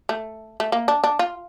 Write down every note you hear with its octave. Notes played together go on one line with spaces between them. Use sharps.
A3
A3
A#3
D4
D4
F4